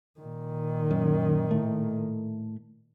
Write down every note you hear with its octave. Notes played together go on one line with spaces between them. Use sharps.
A#2 D#3
F#2
A2 A3